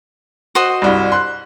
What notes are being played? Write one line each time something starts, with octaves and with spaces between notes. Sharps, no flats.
F#4 C5 D#5
C2 G2
C6 F#6